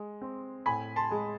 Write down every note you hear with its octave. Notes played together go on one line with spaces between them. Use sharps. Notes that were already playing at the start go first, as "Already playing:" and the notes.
Already playing: G#3
C4
A2 G#5 B5
A5 C6
G#3